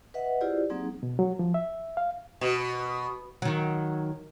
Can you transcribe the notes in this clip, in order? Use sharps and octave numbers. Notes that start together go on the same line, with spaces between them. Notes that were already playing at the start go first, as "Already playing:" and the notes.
B4 D#5 E5 F#5
E4 F4 G4 G#4 C5 D5
F#3 A#3 C4 D#4 G#4
B2
F#3
F3
E5
F5
B2
D#3 F#3